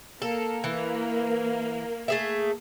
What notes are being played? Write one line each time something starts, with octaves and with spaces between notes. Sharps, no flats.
A#3 A4
E3
A3 G#4 E5